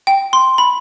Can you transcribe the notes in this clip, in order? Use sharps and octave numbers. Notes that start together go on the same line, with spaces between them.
G5
C6
B5